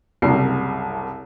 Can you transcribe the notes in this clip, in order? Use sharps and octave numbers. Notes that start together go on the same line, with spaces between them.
F#1 C2 A#5 C7